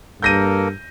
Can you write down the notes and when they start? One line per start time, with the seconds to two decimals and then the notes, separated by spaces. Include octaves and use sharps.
0.22 G2 A#3 A4 A#4 G6 A#6 D#7